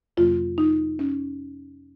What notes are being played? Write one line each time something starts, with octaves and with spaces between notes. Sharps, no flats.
F2 C3 F#3 A#3 F4
D#4
C#4